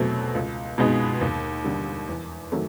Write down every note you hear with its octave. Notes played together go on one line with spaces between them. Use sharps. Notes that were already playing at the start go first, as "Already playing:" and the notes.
Already playing: E2 B2 F#3 A3 C4
C#2
B2 G#3 B3 D#4
D#2
D3 G3
E2
D#3 F#3 A3